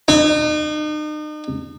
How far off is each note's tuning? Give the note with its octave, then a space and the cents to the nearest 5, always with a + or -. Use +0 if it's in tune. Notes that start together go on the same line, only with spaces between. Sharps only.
D#4 -40